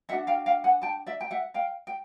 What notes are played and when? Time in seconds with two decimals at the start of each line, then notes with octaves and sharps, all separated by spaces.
0.09 D4 F#4 A4 E5 F#5
0.27 F5 G5
0.46 F5 G5
0.64 F#5 G#5
0.82 G5 A5
1.06 D5 E5
1.21 G5
1.31 E5 F#5
1.54 F5 G5
1.87 G5